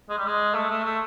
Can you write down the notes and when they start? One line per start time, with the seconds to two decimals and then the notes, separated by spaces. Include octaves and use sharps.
0.09 G#3
0.18 G3
0.26 G#3
0.54 A3
0.69 A3
0.85 A3